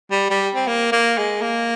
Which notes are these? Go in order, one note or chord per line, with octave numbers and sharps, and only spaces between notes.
G3
G3
C4
A#3
A#3
G#3
A#3